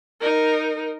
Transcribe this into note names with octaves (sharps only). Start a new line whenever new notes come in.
D#4 A#4